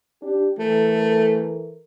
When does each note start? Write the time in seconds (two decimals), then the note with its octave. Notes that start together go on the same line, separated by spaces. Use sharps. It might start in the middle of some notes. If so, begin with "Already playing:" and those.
0.22 D4 G4
0.59 E3 A3 A4 A#4